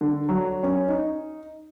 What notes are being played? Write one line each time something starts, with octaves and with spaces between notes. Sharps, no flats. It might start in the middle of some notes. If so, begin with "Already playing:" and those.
D3
F#3
C#4
D#4